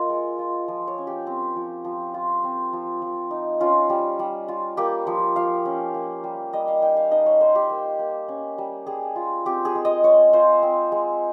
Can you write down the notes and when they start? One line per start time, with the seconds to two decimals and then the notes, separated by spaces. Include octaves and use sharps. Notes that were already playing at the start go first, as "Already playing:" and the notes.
Already playing: A#3 F4 D#5
0.10 G#3
0.39 F4
0.68 F3
0.87 C#5
0.98 C#4
1.07 G4
1.27 C4
1.56 F3
1.84 F3
2.14 F4
2.44 C4
2.73 F3
3.02 F3
3.31 D#4
3.60 C#4 F4
3.90 G3
4.19 G3
4.48 F4
4.77 A#3 G4
5.07 F3
5.36 F3 F5
5.65 C#4
5.94 A#3
6.24 G3
6.53 G3 D#5
6.68 F5
6.82 D#4 G5
6.97 F5
7.11 D#4 D#5
7.26 C#5
7.41 D#4 C5
7.55 G4
7.70 A#3
7.99 A#3
8.28 C#4
8.58 G3
8.87 G3 G#4
9.16 F4
9.45 C4 G4
9.65 G#4
9.75 G#3
9.85 D#5
10.04 G#3 C#5
10.33 F4 C5
10.63 C4
10.92 G#3